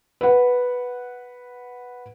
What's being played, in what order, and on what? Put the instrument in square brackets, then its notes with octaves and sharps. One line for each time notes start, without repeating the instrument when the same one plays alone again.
[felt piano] B4 F#5